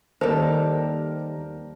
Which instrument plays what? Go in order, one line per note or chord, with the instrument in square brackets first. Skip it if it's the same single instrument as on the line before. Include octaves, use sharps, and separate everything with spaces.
[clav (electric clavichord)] D#2 [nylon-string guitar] G3 A4 [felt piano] A#4 [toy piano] C5